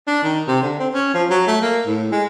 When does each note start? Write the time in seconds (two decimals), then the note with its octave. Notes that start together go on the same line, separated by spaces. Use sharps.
0.07 D4
0.23 D#3
0.47 C3
0.63 D3
0.79 C4
0.94 C#4
1.14 F3
1.30 F#3
1.47 A3
1.62 A#3
1.87 A2
2.12 G#3